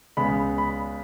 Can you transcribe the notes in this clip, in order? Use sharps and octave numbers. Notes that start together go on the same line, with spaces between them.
C#2 C#3 G#3 B3 B5
B5